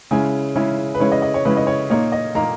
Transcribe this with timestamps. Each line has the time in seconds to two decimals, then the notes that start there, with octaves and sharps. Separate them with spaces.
0.11 C#3 G#3 C#4 E4 G#5
0.56 C#3 G#3 C#4 E4
0.94 B4
1.00 C#3 G#3 C#4 E4 C#5
1.12 D#5
1.22 D#5
1.34 C#5
1.45 C#3 G#3 C#4 E4 B4
1.57 D#5
1.67 C#5
1.90 A#2 A#3 D#4 C#5
2.12 D#5
2.35 A#2 A#3 D#4 A#5